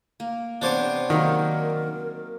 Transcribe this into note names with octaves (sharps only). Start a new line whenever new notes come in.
A#3
C3 B3 D4 C5 C#5 D6
D#3 F#3 A#3 C4 A#4